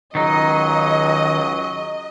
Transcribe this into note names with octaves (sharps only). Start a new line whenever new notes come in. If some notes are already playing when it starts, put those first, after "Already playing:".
C#2 D#3 F#3 D#4 D#5